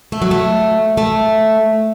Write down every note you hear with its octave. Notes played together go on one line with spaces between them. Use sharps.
A3
F#3
A3
A3